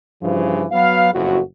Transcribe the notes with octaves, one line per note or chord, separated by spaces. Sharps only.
G2 C#3 E3 F3
F#3 B3 F5
F#1 F2 A2 F#4